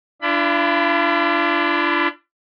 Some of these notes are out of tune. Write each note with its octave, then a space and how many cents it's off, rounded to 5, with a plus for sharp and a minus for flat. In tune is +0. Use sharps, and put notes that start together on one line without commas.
D4 +0 F4 -45 B5 +20